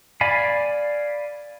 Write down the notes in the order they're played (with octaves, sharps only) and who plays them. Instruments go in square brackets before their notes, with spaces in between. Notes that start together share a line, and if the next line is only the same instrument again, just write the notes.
[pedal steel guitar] D5 F5 G#5 B5